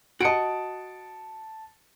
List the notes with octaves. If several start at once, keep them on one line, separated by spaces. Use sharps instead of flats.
F#4 D#5 A5 C#7 D7